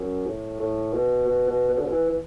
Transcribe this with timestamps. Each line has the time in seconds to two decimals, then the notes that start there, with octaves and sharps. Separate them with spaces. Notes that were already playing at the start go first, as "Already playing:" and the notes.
Already playing: F#2
0.26 A2
0.59 A2
0.93 B2
1.26 B2
1.48 B2
1.70 B2
1.77 D3
1.84 B2
1.91 E3
2.08 E3